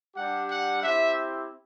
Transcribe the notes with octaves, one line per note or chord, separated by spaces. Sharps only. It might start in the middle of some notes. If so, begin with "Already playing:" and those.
G3 D4 G4 F#5
F#5
C4 E4 G4 E5